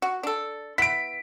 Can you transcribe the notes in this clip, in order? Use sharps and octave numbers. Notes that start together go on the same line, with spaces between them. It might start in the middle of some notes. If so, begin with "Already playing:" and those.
F#4
D4 A4
B3 E4 B6 D7